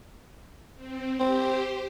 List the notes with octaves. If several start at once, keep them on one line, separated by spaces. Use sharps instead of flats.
C4
C4 G4 C5